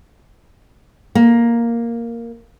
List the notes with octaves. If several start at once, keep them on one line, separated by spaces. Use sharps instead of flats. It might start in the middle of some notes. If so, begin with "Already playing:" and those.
A#3